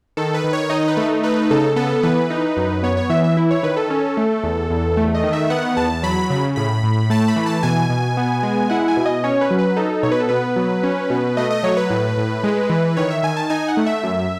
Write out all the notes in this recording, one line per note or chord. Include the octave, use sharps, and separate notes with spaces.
D#3 A4
B4
D#3
C#5
D#4 D#5
B4
A3
D#4 B4
C#3 A4
B3 A4
E3 B4
D#4
F#2
B3 C#5
C#5
E3 E5
E5
E4
C#5
D#3 B4
A4
C#4
A3
E2
E2
A3
D#5
D#3
E5
B3 F#5
E2 A5
F#3 B5
C#3 B5
A2 B5
A2
A3 A5
B5
E3
A5
B2 G#5
B2
B3
G#3
E4 F#5
G#5
B2
D#5
C#4 C#5
B4
F#3
B4
D#4 A4
B2 C#5
B4
A4
B3 B4
F#3
C#4
B2
A3 D#5
D#5
F#3 C#5
B4
A2
A2
G#3
E3
D#3 C#5
E5
D#3 G#5
A5
D#4 G#5
F#5
A3
E5
F#2